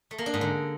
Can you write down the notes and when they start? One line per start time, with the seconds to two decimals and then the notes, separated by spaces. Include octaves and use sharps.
0.11 A3
0.18 A#3
0.26 D4
0.34 G#2
0.41 D3